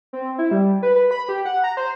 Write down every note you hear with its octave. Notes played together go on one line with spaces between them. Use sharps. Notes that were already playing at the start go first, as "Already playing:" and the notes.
C4
E4
G3
B4
B4
B5
G4
F#5
A#5
C5